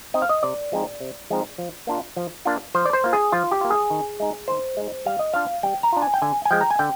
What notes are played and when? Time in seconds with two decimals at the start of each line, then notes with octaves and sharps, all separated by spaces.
0.14 C4 D#4 D#5
0.22 F5
0.29 D#5
0.43 C3 D5
0.72 F3 G#3 C4 D#4
1.00 C3
1.30 F3 G#3 C4 D#4
1.58 F3
1.87 A#3 D4 F4
2.16 F3
2.45 A#3 D4 F4
2.74 F3 C5
2.85 D5
2.93 C5
3.04 A#3 F4
3.13 G#4
3.32 F3 F4
3.51 G4
3.61 A#3 F4
3.70 G#4
3.90 D#3
4.20 G#3 D#4
4.48 D#3 C5
4.77 G#3 D#4
5.06 G3 F5
5.19 D#5
5.33 D4 F4 F5
5.63 G3 G5
5.83 A#5
5.93 D4 F4
6.02 G#5
6.14 G5
6.22 D3 G#5
6.45 G#5
6.51 F3 G#3 G5
6.61 A#5
6.71 G#5
6.79 D3 G5